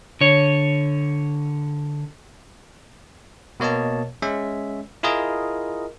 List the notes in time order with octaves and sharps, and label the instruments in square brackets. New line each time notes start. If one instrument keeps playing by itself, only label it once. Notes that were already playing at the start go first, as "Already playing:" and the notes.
[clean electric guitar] D3 C#5
[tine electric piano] B2 A#3 C#5 D#5 A5
G#3 C#4 E5
E4 F4 G#4 A#4 D#5